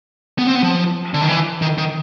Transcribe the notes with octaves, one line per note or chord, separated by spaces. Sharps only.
B3
C4
B3
F3
D3
D#3
E3
D#3
D#3